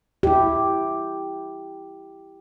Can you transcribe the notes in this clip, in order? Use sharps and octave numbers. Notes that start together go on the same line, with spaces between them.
E4 G4